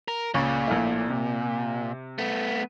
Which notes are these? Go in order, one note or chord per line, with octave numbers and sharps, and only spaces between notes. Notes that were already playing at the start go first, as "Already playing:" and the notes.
A#4
C#2 A#2 C#3 C#6
A#1 A2 A3
C3
A3 B3